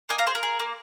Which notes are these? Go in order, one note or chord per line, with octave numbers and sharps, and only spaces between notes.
A#3 D#5 G#5
F5 A#5
G#4 C5
A#4
G#4
A#3